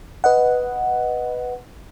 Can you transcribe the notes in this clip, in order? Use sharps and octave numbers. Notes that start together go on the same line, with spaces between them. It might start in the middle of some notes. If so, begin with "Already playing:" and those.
B4 D#5 F#5